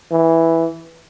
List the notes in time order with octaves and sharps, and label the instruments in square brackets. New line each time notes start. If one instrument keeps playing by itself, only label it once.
[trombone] E3